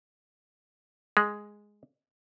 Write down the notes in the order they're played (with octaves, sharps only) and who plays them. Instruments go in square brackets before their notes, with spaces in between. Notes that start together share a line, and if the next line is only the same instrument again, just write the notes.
[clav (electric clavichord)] G#3